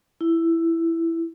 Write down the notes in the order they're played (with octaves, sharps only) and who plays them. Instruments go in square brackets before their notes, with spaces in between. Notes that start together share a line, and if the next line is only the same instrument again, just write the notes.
[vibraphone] E4